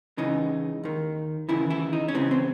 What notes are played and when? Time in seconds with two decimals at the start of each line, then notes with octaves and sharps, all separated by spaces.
0.18 C#2 C#3 E3 D#4
0.83 D#2 D#3
1.49 D#2 C#3 E3 E4
1.70 E4
1.93 D#4
2.08 C#4
2.15 C#2 C#3 E3 C4
2.31 C4